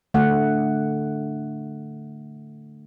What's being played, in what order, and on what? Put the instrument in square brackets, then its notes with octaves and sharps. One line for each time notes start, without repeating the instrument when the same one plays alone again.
[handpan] D3 A3 F#5